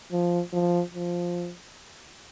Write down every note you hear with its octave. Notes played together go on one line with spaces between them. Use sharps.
F3
F3
F3